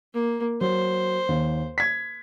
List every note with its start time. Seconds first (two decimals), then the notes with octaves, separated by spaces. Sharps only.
0.14 A#3
0.61 F#3 C5
1.28 D#2
1.78 G#6 B6